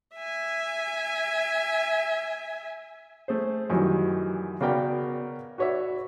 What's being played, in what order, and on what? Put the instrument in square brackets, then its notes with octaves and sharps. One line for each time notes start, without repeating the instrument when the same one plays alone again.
[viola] E5 G#5
[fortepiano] A3 G#4 C5
F#2 D#3 E3 F#3 G3
C#3 B3 F#4 A#4 D5 G5
F#4 B4 C#5 D5 E5